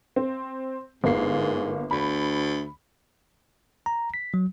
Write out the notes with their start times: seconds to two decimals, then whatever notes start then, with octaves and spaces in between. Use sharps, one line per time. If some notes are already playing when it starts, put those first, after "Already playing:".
0.16 C4
1.04 G1 G#2 A#3 C7
1.91 D2 B5
3.86 A#5
4.14 B6
4.34 F#3